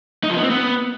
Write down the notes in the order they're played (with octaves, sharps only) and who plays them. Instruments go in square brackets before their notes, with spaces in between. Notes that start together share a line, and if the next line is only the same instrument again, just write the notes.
[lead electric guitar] D#4
F3
B3
C4
B3